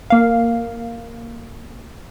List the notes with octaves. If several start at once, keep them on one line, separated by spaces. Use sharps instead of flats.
A#3 F5